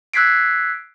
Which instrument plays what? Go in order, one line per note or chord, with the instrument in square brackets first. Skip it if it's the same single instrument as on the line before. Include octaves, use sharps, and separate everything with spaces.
[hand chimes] E6 F#6 G#6 B6 C7 D7